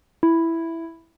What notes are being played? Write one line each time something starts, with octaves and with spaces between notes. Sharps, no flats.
E4